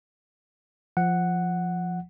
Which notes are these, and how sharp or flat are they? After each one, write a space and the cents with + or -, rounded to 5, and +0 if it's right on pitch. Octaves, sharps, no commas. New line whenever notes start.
F3 +0 F#5 +0